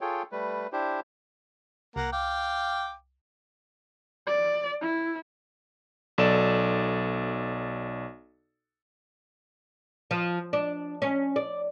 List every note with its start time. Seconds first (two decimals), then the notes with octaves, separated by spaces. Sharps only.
0.01 F4 G#4 A4 C#5 G5
0.32 G3 A3 B4
0.72 D4 E4 G4 C5
1.96 C2 A#3 F#5 A#5
2.12 F5 G5 D6
4.27 D5
4.81 E4
6.18 B1 A4 D5 E7
10.11 F3
10.53 D4
11.02 C#4
11.36 D5